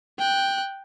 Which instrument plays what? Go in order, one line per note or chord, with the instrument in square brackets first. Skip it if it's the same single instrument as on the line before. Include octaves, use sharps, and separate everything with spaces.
[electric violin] G5 F#6